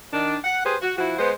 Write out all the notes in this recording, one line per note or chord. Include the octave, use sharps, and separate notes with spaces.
D#3 D4
F#5
G4 G#4 B4 C5
F#4
F3 E4 F#4
G#3 B3 C5